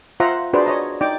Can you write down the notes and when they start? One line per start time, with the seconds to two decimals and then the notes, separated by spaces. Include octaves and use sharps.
0.20 F4 C5 E5 F#5 A#5
0.53 D4 F#4 G#4 B4 C5 D5
0.66 C#5 D#5 A#5
1.01 D#4 D5 G5 D6